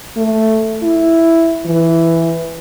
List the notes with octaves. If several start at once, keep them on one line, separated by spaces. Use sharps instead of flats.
A3
E4
E3